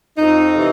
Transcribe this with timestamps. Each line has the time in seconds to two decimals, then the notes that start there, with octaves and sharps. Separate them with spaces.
0.18 F2 D#4
0.54 C3 E3